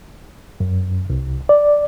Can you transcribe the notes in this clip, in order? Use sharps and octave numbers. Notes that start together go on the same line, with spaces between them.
F#2
C2
D5